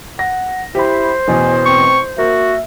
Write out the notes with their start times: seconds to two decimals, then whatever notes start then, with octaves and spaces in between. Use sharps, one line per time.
0.19 F#5 A#6
0.75 E4 G4 C5 B5
1.28 A1 E2 B2 G#5
1.66 C4 C#6
2.18 A#3 F#4 E5